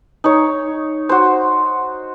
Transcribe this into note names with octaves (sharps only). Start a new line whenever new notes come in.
D#4 C#5
F#4 C5